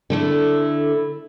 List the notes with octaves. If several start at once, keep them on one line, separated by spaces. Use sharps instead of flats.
D3 A3 E4